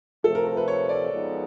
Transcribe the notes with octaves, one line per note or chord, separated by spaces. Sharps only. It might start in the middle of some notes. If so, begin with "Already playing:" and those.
C3 F3 A3 A4
A#4
A#4
B4
C#5
D5
F3 G#3 B3 D#4